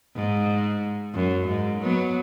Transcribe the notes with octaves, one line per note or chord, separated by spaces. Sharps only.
G#2
F#2
G#2
F#3 B3